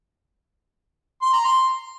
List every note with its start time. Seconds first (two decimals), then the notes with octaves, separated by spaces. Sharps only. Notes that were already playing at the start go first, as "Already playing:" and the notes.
1.22 C6
1.33 A#5
1.45 C6